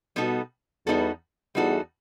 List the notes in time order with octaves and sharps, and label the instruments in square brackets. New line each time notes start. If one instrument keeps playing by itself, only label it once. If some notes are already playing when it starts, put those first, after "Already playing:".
[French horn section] B2 [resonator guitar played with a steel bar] G3 B3 D#4 F#4 A4
[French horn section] E2 [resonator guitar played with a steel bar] G3 B3 D#4 F#4 A4
[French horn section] E2 [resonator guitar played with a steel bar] G3 D#4 F#4 A4